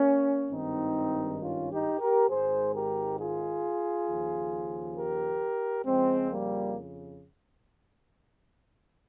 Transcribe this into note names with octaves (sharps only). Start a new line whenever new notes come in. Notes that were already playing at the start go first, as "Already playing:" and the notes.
Already playing: A#3 C#4
G#1 G2 D#3 C4 D#4
C#4 F4
D#4 G4
G4 A#4
G#1 G#2 D#3 G#4 C5
G4 A#4
F4 G#4
D#2 C#3 F3
G4 A#4
F2 C#3 F3 G#3 C4
G3 A#3